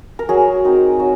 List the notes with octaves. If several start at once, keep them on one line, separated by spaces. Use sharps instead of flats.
A#4
F#3 G#4
C4 D#4
F#3